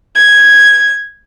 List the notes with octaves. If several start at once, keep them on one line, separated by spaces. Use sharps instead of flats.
G#6